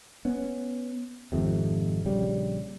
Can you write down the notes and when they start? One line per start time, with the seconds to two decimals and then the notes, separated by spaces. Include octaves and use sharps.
0.25 B3 C#4
1.32 G#1 F2 C3
2.05 A#1 C#3 G3